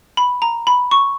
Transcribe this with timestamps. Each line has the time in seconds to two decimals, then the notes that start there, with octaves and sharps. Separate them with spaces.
0.17 B5
0.42 A#5
0.67 B5
0.91 C#6